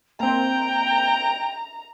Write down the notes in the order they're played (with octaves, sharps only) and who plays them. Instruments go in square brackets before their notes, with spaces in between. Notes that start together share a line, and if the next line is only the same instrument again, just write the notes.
[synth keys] A#3 C4 [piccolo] G5 [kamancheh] A#5